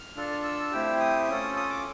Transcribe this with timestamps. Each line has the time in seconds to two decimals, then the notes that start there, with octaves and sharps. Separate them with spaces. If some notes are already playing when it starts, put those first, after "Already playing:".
Already playing: F6
0.16 D4 F4 A4
0.44 E6
0.72 A3 C4 E4 G4
1.00 D#6
1.28 C#4 F4 A4
1.57 D#6
1.70 D6